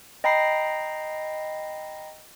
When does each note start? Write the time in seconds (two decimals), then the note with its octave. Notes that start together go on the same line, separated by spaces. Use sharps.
0.24 D#5 G5 A#5 B5 A#6 C7